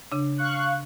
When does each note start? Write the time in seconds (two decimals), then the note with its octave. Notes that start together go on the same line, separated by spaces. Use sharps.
0.12 C#3 D4
0.38 F5 C#6 F#6